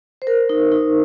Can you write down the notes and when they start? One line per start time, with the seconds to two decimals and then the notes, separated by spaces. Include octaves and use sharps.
0.22 C5
0.27 A#4
0.49 D#4
0.72 D#4